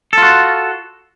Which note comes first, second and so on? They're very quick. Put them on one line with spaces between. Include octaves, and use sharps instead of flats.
A4 F4 F#4